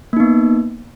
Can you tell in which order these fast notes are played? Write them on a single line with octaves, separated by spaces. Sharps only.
A#3 D#4 B3